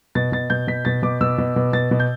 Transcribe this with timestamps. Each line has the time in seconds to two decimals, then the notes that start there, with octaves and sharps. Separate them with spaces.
0.15 B2 A6
0.32 B2 A6
0.50 B2 G6
0.67 B2 B6
0.85 B2 A6
1.03 B2 D6
1.21 B2 E6
1.38 B2
1.56 B2
1.73 B2 A6
1.91 B2
2.00 G6